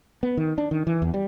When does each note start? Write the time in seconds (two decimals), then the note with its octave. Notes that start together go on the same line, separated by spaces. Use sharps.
0.23 B3
0.37 D#3
0.58 D4
0.71 D#3
0.87 E3
1.02 E2
1.14 G3